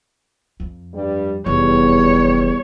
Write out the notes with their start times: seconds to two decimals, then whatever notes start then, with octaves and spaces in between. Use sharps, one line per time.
0.60 F2
0.93 G2 G3
1.46 F1 E2 G3 C#5